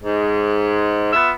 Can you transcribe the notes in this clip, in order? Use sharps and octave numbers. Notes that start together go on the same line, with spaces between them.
G#2
B3 F4 E5